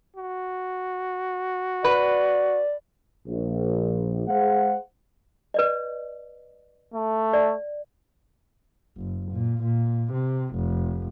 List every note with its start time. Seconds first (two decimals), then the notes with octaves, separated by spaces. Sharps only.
0.16 F#4
1.84 B4 D5
3.26 A#1
4.28 G#3 G#4 C5 F5 F#5
5.54 B4 D5 D#5
6.94 A3
7.33 D5
8.97 F#1
9.32 A#2
9.63 A#2
10.13 C3
10.55 F1